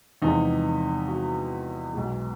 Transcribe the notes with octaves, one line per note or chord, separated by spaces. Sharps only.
E2 C3 F3 G#3 D#4
F#4
B1 B2 G#3